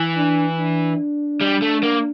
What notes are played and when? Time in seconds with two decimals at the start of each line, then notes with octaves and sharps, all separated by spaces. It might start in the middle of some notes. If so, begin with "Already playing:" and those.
Already playing: E3
0.17 D4
0.59 D4
1.42 G3
1.62 A3
1.83 A#3